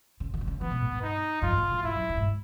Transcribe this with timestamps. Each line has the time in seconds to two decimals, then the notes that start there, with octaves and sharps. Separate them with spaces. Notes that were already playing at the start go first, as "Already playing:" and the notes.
0.20 C#3
0.34 D3
0.41 C3
0.47 C#3
0.61 E3 B3
0.71 B2
0.81 A2
0.91 G2
1.02 D#4
1.42 F#2 F4
1.52 G2
1.57 A#2
1.62 A2
1.72 G2
1.83 G#2 E4
1.96 F#2
2.09 G2
2.17 G#2